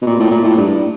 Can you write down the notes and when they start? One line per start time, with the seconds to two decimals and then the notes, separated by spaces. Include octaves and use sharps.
0.02 B2
0.06 A#2
0.20 A2
0.31 A#2
0.44 A2
0.57 G2